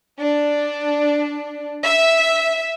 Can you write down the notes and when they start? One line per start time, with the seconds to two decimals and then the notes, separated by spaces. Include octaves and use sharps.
0.21 D4
1.84 E5